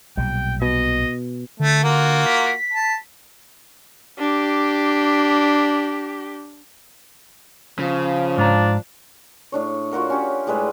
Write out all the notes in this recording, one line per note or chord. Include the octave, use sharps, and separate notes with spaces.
B1 A#2 G3 G5
B2 D#5
D3 A3
A#3 F4 F#4
B6
A5
D4 G4
C#3 F3
G#2 D4 F5 A#5
A2 D4 C#5
F4 F#4 A#4 F#5
C#4 G4
A2 G3 G#3 B4